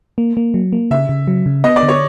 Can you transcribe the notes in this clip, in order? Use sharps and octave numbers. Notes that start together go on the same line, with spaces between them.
A#3
A#3
F#3
A#3
C#3 E5
C#3
F#3
C#3
B3 D#5
D5
D3
C#5